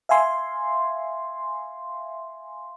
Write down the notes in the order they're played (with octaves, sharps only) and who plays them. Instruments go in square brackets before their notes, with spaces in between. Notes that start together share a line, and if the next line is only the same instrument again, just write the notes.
[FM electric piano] E5 F5 G#5 C6